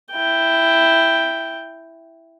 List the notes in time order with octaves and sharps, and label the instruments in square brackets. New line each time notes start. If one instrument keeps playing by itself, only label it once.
[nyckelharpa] E4 G5